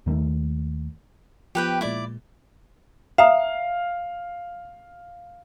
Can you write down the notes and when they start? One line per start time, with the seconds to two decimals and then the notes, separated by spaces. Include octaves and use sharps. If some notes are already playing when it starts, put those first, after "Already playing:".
0.06 D#2 D#3 F#3 A3
1.55 F3 B3 G4 B4 G5
1.81 A#2 G#3 E4 D5
3.18 E5 F5 A#5 D#6